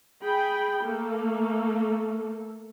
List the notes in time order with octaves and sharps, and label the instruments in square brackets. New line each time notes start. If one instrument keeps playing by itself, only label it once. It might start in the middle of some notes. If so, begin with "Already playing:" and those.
[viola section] G#4 G5 B5
A3 A#3 A4